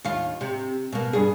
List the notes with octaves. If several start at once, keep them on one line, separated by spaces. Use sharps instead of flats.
D#2 F4
C3
B2 A#3
G2 G#4